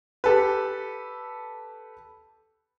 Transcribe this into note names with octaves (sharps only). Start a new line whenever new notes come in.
G4 A4 B4